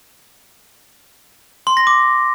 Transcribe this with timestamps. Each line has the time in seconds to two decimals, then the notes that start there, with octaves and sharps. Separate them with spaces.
1.67 C6
1.77 A#6
1.87 D6